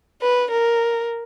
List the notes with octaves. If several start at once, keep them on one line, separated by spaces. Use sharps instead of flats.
B4
A#4